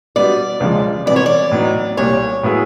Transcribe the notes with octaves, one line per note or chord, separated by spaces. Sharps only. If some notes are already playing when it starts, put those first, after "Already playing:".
B2 G3 B3 D4 D5
C#2 C#3 F3 G#3
C3 E3 G3 B3 D5
C#5
D5
A2 F#3 B3 D#4
C2 A#2 G3 C#5
A2 F#3 B3 E4 G#4